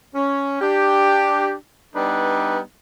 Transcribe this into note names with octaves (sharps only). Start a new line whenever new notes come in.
C#4
D4 G4
G3 B3 D4 D#4 B4